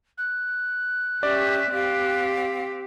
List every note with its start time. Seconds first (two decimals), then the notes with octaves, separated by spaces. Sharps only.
0.18 F#6
1.23 C#4 G4 D5 E5
1.73 C4 G4 F5